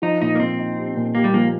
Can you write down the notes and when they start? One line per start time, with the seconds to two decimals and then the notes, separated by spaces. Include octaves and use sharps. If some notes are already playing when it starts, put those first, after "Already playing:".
0.02 F3 D#4
0.21 A#2 D#4
0.35 A#3
0.40 A#2 C4
0.59 D#4
0.78 G4
0.96 A#2
1.15 A#3 G4
1.24 G3
1.34 F3 A#3